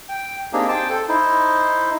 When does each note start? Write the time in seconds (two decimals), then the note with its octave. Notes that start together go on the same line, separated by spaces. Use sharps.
0.09 G5
0.53 A#3 C4 D4 D#4 G4 G#4
0.68 C5 G5 A5
0.90 A4 C5
1.09 D#4 E4 C5